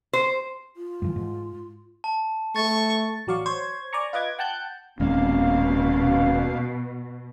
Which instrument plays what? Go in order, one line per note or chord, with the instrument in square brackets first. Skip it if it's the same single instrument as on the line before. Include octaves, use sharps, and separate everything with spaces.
[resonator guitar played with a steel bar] C5
[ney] F4
[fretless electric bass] G2 D#3 E3
G#2
[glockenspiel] A5
[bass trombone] A3 [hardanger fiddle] C#6 [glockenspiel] A6
[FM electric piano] A1 F#3 D5 F5 C#6
C5 C#5 G#6
D5 G#5 A#5 C#6
F4 B4 D#5 D6 G#6
F#5 G5 A5 F#6 G6
[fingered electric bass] D#1 G#3 C4 [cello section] B2 [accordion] A#3 F5 [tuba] C#4